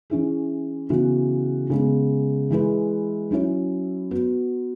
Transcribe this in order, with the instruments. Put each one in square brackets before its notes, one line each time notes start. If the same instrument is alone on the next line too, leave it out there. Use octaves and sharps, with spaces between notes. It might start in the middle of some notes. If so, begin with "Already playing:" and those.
[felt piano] E3 C#4 E4 G#4
C#3 E3 B3 F#4
C#3 G#3 B3
E3 G#3 E4 B4
F#3 C#4 E4 C#5
B3 F#4 B4